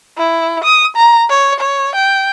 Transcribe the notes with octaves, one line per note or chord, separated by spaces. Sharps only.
E4
D#6
A#5
C#5
C#5
G5